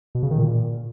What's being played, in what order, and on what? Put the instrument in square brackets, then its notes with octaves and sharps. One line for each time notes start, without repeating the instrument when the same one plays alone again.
[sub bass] B2
C#3
D#3
A#2